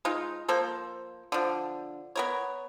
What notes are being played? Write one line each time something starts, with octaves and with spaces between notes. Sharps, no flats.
G#3 D#4 F4
F3 A#3 A4 C5
D3 F3
B3 A#4 C#5